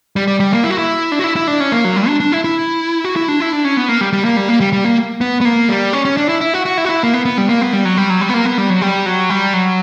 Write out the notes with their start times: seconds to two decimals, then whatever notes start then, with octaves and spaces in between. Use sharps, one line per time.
0.16 G3
0.27 G3
0.40 G3
0.52 A#3
0.64 E4
0.70 F#4
0.78 E4
1.12 D4
1.19 F#4
1.24 E4
1.36 E4
1.47 D4
1.60 C#4
1.72 A#3
1.85 F#3
1.96 G3
2.08 D4
2.20 D4
2.32 E4
2.44 E4
3.05 F#4
3.16 E4
3.28 D4
3.40 E4
3.53 D4
3.65 C#4
3.77 B3
3.89 A#3
4.01 G3
4.13 G3
4.25 A#3
4.37 G3
4.48 A#3
4.61 G3
4.73 G3
4.85 A#3
5.21 B3
5.41 B3
5.45 A#3
5.69 G3
5.93 C#4
6.05 C#4
6.17 D4
6.29 E4
6.41 E4
6.54 F#4
6.65 F#4
6.78 E4
6.85 F#4
6.89 E4
7.03 A#3
7.14 B3
7.25 B3
7.38 G3
7.49 A#3
7.61 B3
7.73 G3
7.85 F#3
7.97 G3
8.10 F#3
8.21 G3
8.29 B3
8.34 A#3
8.45 B3
8.58 G3
8.70 F#3
8.82 G3
9.06 F#3
9.30 G3
9.54 F#3